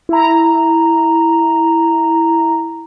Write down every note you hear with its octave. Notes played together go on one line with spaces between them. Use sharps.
E4 A#5